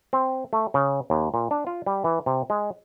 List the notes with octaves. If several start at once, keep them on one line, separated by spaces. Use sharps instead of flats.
C4
A3
C#3
D#2
A#2
D4
F4
G3
E3
C3
G#3